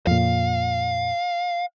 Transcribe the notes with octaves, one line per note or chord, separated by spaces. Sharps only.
F2 A#2 F5